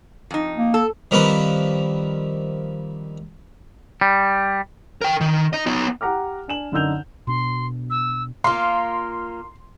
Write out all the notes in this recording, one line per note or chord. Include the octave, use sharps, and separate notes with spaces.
F2 D#4
A#3
A4
D#3 F3 G3 A#3 C4 B4
G3
A#4 G5
D#3
D#4 D#5
B3 D#4
G4 F#5 A#5 D6 F6
D4 G#5 E7 F#7
F#2 D3 D#4 E6 G6 F7
B2 D4 C6
E6
A#3 F4 C6